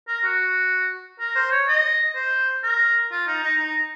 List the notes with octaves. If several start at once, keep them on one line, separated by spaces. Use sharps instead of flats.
A#4
F#4
A#4
C5
C#5
D#5
C5
A#4
F4
D#4
D#4
D#4